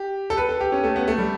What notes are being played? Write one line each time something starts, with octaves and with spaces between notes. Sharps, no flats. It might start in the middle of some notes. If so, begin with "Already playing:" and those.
Already playing: G4
A4
B4
A4
G4
C#4
A3
B3
A3
G3